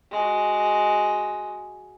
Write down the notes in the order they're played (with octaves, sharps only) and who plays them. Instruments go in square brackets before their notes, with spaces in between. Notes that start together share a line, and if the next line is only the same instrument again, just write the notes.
[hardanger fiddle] G#3 F#4